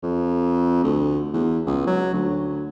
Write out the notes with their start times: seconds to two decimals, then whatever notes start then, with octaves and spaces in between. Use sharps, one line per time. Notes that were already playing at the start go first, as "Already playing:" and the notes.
0.03 F2
0.84 D2
1.33 E2
1.66 C#2
1.87 F#3
2.14 D2